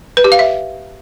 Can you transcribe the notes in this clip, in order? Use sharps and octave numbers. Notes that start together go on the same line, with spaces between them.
B4
G4
F5
E5